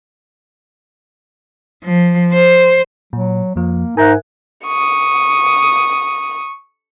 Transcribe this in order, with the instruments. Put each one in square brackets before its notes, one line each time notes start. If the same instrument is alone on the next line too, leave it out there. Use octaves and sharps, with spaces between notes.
[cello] F3
C5
[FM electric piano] A#2 [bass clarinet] F#3
[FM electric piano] F2 F3 [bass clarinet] A#3
[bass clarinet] G#2 [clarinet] D#4 [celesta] A#4 E5 F#6 [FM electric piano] G#5
[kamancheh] C#6 D#6